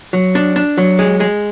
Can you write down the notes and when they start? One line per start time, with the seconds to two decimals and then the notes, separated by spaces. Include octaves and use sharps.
0.13 F#3
0.35 D4
0.56 D4
0.78 F#3
0.99 G#3
1.20 G#3